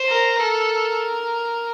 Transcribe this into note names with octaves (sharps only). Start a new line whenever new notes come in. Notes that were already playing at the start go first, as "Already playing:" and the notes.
Already playing: C5
A#4
A4 A#4